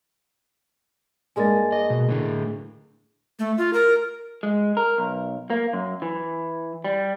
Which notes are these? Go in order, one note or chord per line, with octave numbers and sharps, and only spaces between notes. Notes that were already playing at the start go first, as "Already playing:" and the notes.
G2 G#3 A#3 G#5 A6
G#4 D#5
B2
A2 D3
A3
F4
A#4
G#3
A#4
B1
A#3
F#2
E3
G3